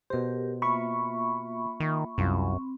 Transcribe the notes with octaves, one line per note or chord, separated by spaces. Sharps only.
B2 G4 A#4 C5
A#3 F4 E5 B5 C#6
D#3
C2 F#2 C4 F4